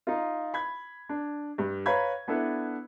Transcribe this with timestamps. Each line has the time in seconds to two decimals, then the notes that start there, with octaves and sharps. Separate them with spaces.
0.07 D#4 F4
0.54 B5 G#6
1.09 D4
1.58 G2
1.86 B4 C#5 F5 A#5 B5 G#6
2.28 B3 D4 E4 A4 B4